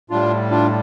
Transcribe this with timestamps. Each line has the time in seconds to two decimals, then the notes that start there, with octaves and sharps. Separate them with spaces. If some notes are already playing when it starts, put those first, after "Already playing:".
0.10 A2 G3 D4 F4
0.51 D4 F4